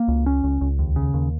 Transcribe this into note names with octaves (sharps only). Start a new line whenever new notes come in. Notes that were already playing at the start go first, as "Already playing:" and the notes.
Already playing: A#3
C#2
C#4
C#2
C#2
D#2
C#3
D#2